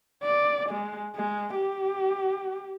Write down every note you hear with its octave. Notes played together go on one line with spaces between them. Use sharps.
D5
G#3
G#3
G4